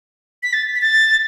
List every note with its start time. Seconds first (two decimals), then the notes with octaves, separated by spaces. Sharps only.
0.43 B6
0.53 A6
0.76 B6
0.81 A6